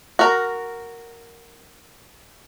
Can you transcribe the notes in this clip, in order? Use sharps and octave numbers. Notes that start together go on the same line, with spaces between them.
F#4 A#4